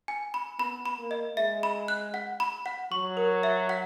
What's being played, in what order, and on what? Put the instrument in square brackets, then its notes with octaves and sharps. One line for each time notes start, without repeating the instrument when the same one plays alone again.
[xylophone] G#5
B5
[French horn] B3 [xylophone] B5
[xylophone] B5
[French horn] A#3
[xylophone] D#5
[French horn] G#3 [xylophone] E5
[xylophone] B5
F#6
F#5
B5
F#5
[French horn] F#3 [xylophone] C#6
[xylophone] A#4
E5
F#5